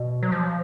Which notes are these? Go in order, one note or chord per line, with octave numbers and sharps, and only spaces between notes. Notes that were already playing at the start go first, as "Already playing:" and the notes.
Already playing: B2
F#3
F3